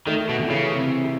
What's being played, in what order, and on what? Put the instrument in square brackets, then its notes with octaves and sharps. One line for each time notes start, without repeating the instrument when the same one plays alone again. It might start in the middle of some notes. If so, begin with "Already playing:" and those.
[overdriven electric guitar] D#3 [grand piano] A3
[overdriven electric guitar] B2
[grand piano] E3
[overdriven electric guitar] C#3
[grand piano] C3
C3